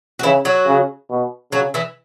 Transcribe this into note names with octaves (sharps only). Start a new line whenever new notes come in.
F#4
C#3 E3 E4
F#3 F#4
C#3
B2
C#3 F#3 F#4
E3 E4